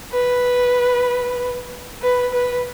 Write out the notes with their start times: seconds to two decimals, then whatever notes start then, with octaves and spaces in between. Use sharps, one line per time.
0.13 B4
2.02 B4
2.33 B4